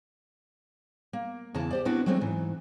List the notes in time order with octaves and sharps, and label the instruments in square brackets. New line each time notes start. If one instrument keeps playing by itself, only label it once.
[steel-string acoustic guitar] A#3
E2 C#3 E3 A5
G4 C5 D5
B3 C4 D4 E4 F#4 B4
F#3 G#3 A3 C4 D4
G#2 E3